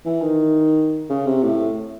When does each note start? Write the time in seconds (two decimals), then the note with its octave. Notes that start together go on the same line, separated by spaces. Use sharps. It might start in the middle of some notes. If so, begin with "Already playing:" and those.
0.05 E3
0.22 D#3
1.09 C#3
1.26 C3
1.43 A2